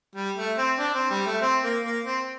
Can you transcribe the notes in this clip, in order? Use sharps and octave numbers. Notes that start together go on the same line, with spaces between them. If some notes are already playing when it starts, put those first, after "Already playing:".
G3
A3
C4
D4
C4
G3
A3
C4
A#3
A#3
C4